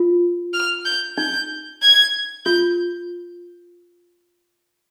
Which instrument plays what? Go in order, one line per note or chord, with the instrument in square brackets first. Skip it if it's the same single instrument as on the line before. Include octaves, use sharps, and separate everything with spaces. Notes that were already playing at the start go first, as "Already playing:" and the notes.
Already playing: [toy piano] F4
[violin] F6
G6
[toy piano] D#4 [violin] G6
[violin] G#6
[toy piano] F4 [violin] G6